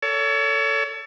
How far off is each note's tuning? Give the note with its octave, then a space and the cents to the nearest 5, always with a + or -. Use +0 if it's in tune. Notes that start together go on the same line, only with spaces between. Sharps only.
A4 +15 C#5 +35